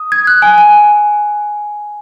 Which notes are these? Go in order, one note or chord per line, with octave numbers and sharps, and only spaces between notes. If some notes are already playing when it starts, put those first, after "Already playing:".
Already playing: D#6
G#6
F#6
G#5
G#5